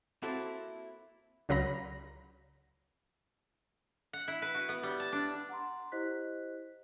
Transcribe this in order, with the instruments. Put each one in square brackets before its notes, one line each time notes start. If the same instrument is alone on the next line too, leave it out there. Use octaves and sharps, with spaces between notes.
[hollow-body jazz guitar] A#3 C4 E4 F#4 A4
[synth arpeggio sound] C#2 C#3 F#3 A#5 B5 A#6
[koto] F#5
E4
B4
F#4
B3
G3
A5
D4
[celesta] F#5 A#5 C6
E4 G4 C5 D#5 F#6 B6